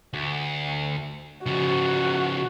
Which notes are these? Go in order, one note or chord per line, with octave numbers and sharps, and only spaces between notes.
D2
C#3 F3 F#4